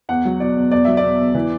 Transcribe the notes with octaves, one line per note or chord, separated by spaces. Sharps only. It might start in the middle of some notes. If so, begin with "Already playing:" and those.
E2 F#5
F#3
B2 D5
E2
E2 D5
F#3 E5
D5
B2
E2
E3